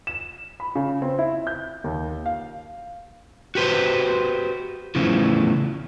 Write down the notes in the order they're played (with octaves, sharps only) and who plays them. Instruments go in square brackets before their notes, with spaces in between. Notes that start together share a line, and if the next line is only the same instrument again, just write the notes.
[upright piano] E7
B5
C#3
C4
E4
G6
D#2
F5
[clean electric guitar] F#4 G4 B4 C5
E2 A2 C#3 E3 F3